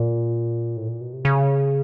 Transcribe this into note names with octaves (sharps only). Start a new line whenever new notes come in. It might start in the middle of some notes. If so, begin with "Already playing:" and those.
Already playing: A#2
A2
A#2
B2
C3
C#3